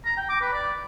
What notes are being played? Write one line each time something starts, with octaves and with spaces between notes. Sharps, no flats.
A#5
G5
D6
B4
D5